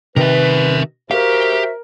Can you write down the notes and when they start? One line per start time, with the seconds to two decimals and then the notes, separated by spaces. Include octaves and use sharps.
0.17 C3 D#3 A#4 B4 E5
1.11 F#4 G4 A#4 C5 E5 F5